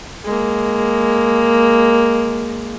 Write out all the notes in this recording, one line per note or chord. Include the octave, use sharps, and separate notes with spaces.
G#3 A#3